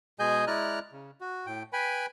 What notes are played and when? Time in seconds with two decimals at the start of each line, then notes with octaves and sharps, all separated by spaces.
0.19 B2 G#3 G#4 D#5 G#5 G6
0.47 G#3 E4 D5 A#5 F6 F#6
0.92 C#3
1.21 F#4
1.46 A2 G5
1.73 B4 G5 G#5 B5